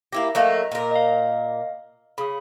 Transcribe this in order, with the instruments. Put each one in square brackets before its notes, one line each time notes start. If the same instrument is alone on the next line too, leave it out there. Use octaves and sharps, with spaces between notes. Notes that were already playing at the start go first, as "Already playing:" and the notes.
[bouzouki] A#3 E4 G4 [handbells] A#6
[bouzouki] F#3 A3 A#3 [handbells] D#5 E5 A#5
[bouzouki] A#2 A#4
[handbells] D#5 F5
[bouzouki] C#3 [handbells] B5 D#6